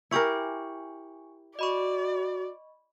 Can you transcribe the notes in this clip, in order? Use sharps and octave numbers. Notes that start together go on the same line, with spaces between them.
E4 G4 A#4 G#5 C#6 C#7
F#4 D5 D#5 B5 C#6